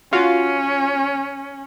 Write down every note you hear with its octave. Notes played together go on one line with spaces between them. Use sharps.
C#4 F4 F#4 F5